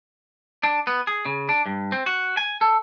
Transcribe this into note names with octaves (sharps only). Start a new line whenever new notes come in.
D4
B3
G#4
C#3
D4
G2
C4
F#4
G#5
A4